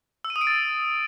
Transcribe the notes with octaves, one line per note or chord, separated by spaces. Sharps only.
E6
D#7
D#6
D7
A6